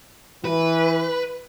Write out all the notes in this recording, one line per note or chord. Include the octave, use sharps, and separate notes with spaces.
E3 B4